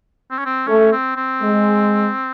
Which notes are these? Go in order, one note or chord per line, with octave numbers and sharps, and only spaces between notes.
C4
C#4
C4
A3 C#4
C4
C4
G#3